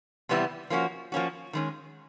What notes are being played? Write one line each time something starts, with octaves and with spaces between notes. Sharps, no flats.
C3 E3 G3 B3 E4
F3 A#3 C#4 F#4
F3 A#3 C#4 F#4
D#3 G#3 C#4